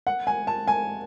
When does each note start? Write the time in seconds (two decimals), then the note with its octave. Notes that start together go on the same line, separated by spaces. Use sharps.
0.07 F#5
0.27 G#5
0.47 A5
0.68 G#5